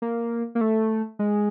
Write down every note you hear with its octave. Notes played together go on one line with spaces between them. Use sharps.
A#3
A#3
A3
G#3